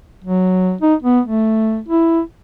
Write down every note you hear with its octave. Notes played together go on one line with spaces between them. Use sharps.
F#3
D#4
B3
A3
E4